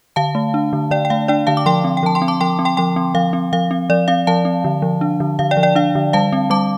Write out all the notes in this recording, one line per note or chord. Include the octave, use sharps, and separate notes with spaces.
D3 F5 A5
A3
D4
D3
D3 D5 G5
G5
A3 F5
D4 D5 G5
D3 F5 A5
D6
F3 G5 C6
C4
G5
F3 A5
G5 C6
C4
A5 D6
F3 G5 C6
C4
G5 C6
F3 G5 C6
C4
F3 F5
C4
F3 F5
C4
F3 D5
C4 F5
F3 F5 A5
C4
D3
F3
D4
D3
D3 F5
D5 G5
F3
D5 G5
D4 F5
D3
G3 F5 A5
C4
G3 A5 D6